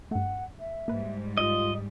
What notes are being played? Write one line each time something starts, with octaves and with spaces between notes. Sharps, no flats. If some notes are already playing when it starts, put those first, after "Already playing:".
G2 A3 F#5
E5
G#2 G3 A#3 B4
F4 D#5